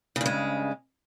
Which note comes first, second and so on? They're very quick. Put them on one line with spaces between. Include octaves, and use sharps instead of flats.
C#3 G2 G#3